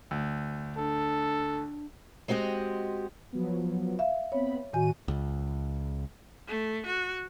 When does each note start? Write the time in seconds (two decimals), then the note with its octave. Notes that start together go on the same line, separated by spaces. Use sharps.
0.11 D2
0.77 D4 A4
2.28 G#3 C4 F#4 G4 D#5
3.33 F3 F#3 B3
3.99 E5 F5
4.32 B3 C4 C#5 B5
4.73 A2 D#3 F#4 G#5 D#7
5.08 C#2
6.47 A3
6.86 F#4